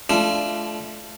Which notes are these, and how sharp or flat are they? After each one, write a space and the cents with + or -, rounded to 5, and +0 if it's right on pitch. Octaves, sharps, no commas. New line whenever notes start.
A3 -30 D4 -5 F4 -25